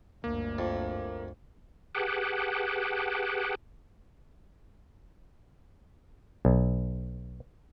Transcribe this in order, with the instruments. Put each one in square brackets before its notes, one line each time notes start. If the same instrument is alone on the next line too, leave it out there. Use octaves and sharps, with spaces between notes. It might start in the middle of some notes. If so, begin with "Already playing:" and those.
[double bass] G1 D2 [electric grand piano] A#3
[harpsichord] F2
[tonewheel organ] G4 G#4 B4 F#5 G5 A5
[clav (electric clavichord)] B1